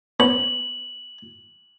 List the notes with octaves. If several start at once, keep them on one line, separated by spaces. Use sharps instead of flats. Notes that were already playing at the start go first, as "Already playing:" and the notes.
B3 C#4 C5 F#7